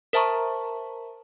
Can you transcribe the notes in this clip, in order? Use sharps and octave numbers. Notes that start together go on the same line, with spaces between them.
A#4 C5 E5 A5 A#5 C#6